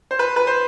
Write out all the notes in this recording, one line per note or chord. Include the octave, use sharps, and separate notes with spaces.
C5
B4
B4
C5